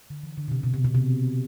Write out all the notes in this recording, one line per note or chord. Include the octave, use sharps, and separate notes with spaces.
D3
E3
D3
B2
C3
B2
C3
B2
C3